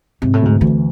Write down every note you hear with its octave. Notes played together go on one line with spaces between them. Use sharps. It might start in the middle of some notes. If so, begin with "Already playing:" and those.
G#2 C3
A2
D2 G#2
D2 E3